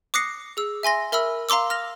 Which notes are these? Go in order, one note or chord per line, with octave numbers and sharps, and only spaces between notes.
D6 D#6 F#6 A#6 C7 C#7
G#4 E6
E5 G#5 C6 A#6
A#4 E5 B5 E6
F5 A#5 C6 D6 E6
F6 A#6 F7